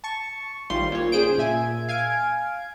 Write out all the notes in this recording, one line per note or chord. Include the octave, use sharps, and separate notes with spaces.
A5 C#6
A1 D#3 G3 F4 C5 C6
A#2 C#5
C#3 G#4 C5 G5 D7
A#2 E5 G#5 G#6
F5 G#5 G#6 D7